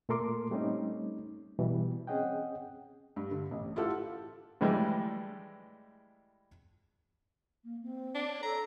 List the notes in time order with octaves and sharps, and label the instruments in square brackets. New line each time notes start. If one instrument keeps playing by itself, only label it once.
[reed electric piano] A#2 A3 A4 A#4 C6 D6
G3 A3 C4 C#4 D#4
B2 E3 G3
C4 C#4 G#4 D#5 F#5 G5
[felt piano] G2
D3
A1
E4 F4 G4 A4 F#5
[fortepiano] A2 E3 G3 G#3
[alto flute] A#3
C4
[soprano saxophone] D4
[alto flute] C#5
[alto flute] A4 [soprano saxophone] A#5